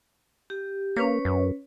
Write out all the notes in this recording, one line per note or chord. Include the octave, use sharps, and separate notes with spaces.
G4
A#3 C#4 B4 C#5
F#2